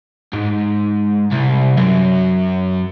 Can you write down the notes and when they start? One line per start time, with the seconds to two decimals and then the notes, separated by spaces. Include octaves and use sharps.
0.33 G#2
1.31 C2
1.77 F#2